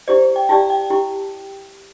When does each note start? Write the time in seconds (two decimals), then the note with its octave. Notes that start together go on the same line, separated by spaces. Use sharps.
0.08 E4 G4 C5 D5
0.36 G5
0.49 E4 G4 D5 A5
0.70 G5
0.90 E4 G4